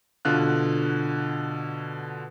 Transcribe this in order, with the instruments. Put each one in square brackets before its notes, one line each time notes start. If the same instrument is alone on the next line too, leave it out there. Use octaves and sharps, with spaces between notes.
[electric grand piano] B2 D3 F4 F#6